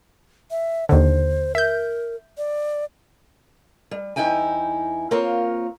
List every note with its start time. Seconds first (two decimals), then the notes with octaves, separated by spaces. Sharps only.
0.51 E5
0.89 D#2 D3 C5
1.55 A#4 E5 G6
2.38 D5
3.91 G3
4.16 E2 G2 D#4 E4 G5 G#5
5.11 A#3 C4 F4 A#4 C#5